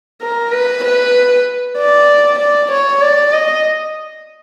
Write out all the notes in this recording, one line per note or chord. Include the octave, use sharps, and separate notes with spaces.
A#4
B4
B4
D5
D5
C#5
D5
D#5